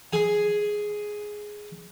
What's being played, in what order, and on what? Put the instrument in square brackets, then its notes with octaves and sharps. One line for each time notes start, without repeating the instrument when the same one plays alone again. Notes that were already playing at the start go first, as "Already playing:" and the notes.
[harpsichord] G#4 G#5